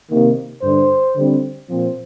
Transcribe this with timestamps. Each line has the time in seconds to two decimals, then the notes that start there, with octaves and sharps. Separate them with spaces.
0.10 C3 D#3 A#3
0.62 G2 D3 G3 C5
1.15 D3 G3 C4
1.68 A#2 F3 C4